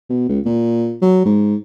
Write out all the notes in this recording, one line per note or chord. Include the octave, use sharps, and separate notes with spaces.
B2
C#2
A#2
F#3
G#2